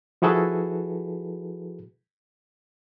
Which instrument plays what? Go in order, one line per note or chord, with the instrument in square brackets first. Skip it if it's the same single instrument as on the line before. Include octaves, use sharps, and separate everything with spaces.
[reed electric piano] F3 E4 F#4 G#4 A4 B4